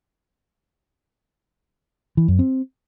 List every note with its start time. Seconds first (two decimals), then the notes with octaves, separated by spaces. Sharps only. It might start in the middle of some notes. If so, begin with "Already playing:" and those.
2.17 E3
2.28 F#2
2.39 C4